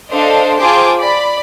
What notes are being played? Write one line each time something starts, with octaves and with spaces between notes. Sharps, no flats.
D4 A4 C5 D#5 F5
F4 G#4 C5 G5 A5 D6
D5 B5